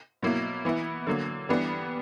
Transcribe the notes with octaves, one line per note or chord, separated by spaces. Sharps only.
B2 F#3 A#3 E4
E3 B3 E4
D3 F#3 A#3
E3 G3 B3 D4